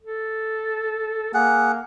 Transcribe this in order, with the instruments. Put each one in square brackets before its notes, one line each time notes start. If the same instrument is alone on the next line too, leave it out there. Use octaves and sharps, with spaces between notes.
[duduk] A4
[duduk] A#3 [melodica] G#4 F#5